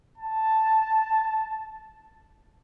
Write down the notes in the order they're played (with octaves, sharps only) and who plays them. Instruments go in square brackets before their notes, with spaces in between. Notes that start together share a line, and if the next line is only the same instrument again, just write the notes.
[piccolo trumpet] A5